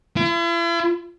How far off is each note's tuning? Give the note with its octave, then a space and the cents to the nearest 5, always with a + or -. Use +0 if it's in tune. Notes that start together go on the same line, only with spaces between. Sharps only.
E4 +45